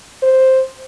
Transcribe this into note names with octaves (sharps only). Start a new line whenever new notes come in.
C5